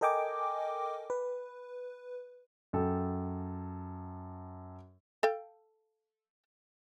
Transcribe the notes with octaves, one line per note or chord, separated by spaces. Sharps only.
A4 A#4 D#5 G5 G#5 D6
B4
F#2 A4 G5
A4 F5 G5